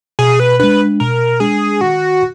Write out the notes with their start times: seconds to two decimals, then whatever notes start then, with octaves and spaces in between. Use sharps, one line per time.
0.19 B2 G#4
0.40 B4
0.60 G#3 D4 B4
1.00 B2 A#4
1.40 G#3 D4 G#4
1.81 D#3 F#4